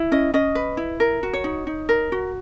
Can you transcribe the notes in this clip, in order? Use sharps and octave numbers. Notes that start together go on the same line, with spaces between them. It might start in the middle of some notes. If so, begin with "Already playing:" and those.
Already playing: E4
C#4 D#5
C#4 D#5
B4
E4
A#4
F#4
C#5
D#4
D#4
A#4
F#4